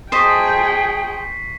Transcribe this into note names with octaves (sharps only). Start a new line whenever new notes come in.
G#4 C5 D#5 G5 A5 C#6 B6 C7